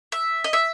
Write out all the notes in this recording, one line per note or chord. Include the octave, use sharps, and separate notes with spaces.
E5
D#5
E5